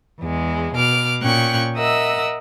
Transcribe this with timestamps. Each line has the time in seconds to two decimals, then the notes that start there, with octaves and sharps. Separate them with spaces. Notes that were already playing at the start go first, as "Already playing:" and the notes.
0.21 E2 G#3
0.75 B2 D6 F6
1.21 A#2 C#4 G5 C#6 F#6
1.76 A#4 D#5 E5 F#5 E6